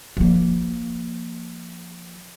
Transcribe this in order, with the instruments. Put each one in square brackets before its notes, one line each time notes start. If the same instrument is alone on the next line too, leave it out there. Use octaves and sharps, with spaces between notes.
[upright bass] F3 A#3